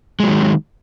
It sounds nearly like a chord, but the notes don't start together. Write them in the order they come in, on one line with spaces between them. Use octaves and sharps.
G#3 F#3 D#3